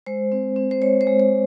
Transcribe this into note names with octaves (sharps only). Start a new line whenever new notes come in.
G#3 C5
C4
C4
C5
G#3 C#5
C5
G#3
C5